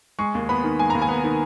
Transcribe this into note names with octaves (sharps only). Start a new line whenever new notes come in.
G#3 C#6
D#2
B3 B5
D#3
G#3 G#5
D#2 A#5
G#5
B3
D#3